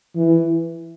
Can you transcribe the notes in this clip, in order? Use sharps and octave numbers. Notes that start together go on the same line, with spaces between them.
E3